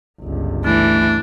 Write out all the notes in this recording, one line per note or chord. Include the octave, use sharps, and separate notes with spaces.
G1 C#2
E3 A3 D4